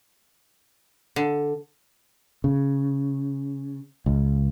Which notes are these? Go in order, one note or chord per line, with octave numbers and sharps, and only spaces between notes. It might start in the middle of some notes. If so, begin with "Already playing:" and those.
D3
C#3
C#2